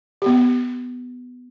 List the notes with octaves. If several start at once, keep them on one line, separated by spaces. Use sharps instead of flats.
B3 G4